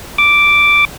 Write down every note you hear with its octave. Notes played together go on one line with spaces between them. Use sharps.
D6